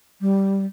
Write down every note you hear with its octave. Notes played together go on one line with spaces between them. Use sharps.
G3